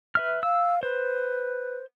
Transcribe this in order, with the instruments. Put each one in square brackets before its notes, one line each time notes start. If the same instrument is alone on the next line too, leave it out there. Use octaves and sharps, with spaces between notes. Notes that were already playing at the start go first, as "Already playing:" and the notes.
[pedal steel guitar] B4 E5 F6
[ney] F5 [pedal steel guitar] E6
[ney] B4 [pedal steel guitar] C5